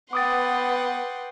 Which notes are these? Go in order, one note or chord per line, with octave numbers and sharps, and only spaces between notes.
B3 B4 F#5 G5 C6 D6 D#6 A6